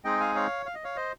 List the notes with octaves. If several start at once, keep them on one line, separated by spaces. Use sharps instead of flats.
G#3 C4 D#4 G#4 D#5 G5
F5 G#5
C#5 F5
F5
D#5
C#5 F5
C5 D#5